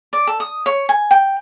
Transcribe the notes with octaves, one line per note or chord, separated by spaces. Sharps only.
D5
A4
D#6
C#5
G#5
G5